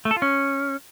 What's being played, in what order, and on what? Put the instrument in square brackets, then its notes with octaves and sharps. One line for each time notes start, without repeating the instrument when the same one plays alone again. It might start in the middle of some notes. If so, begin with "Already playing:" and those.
[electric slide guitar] A3
A4
F4
C#4